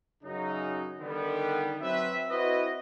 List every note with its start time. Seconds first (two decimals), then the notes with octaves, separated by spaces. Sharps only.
0.24 F#2 C#3 F#3 C#4 D#4
1.01 D3 D#3 G3 B3
1.81 F#3 C4 B4 E5
2.30 C4 E4 F#4 B4 D#5